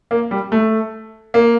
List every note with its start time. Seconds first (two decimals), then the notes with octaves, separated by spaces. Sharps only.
0.11 A#3
0.31 G3
0.52 A3
1.34 A#3